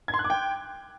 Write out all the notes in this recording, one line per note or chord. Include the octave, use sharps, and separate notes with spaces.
G#6
C6
F#6
D6
G5